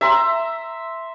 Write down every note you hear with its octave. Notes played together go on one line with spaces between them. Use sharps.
E5 A#5 C6